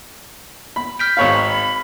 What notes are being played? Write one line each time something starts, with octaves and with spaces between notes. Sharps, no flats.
B5
F6 G6 B6 D7
G#1 C#5 F5 B5